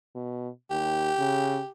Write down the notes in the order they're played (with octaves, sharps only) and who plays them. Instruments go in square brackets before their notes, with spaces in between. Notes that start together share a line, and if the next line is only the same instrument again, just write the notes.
[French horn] B2
[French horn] D#2 [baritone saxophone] G4
[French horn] C#3